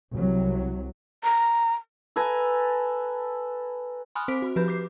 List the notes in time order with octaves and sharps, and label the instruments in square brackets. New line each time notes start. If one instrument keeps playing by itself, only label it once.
[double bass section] C2 F#3
[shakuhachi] A#5
[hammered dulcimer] A4 B4 G#5 A#5
[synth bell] G#5 B5 C6 D#6 F6 F#6
C4 C5 D6 B6 D7
F#4
F3 G4 B4 B5 G6
D6 G6 C7